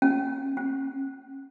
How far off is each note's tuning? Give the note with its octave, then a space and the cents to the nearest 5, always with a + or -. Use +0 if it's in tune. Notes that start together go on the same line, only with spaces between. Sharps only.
C#4 -25
C#4 -45